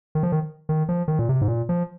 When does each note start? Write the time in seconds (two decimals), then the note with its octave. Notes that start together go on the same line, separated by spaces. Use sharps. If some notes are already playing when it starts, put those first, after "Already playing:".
0.15 D#3
0.23 F3
0.32 D#3
0.69 D#3
0.89 F3
1.08 D#3
1.19 A#2
1.29 C3
1.41 G#2
1.48 A#2
1.69 F3